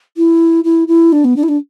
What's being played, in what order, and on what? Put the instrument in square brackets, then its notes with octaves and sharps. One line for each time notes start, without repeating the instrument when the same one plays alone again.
[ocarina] E4
E4
E4
D4
B3
D4
E4
D4